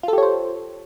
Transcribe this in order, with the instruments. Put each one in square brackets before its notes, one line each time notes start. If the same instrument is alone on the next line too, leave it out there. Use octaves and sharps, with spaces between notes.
[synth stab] F4
A4
G4
C#5
C5